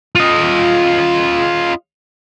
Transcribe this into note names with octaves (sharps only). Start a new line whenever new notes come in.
F4 D#5